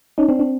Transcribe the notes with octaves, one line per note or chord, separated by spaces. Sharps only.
C#4 D#4
C4 D4
C4 D4